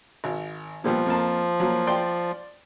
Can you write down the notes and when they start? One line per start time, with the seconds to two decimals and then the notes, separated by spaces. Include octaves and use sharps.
0.24 G#1
0.84 A#2 F3 G3 B3
1.06 F2 A#3 A5
1.60 F#3 A#3
1.87 D5 G5 C6